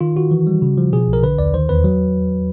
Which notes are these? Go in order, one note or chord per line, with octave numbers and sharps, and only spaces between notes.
D#3 F4
D#3 F#4
E3
G3
C#3
F3
B2 G#4
B1
A#4
D3 B4
D#2 D5
D#3 C5
E2 B4
F#3